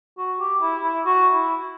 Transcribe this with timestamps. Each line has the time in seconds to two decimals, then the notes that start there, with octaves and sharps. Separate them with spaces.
0.18 F#4
0.40 G4
0.61 E4
0.84 E4
1.05 F#4
1.34 E4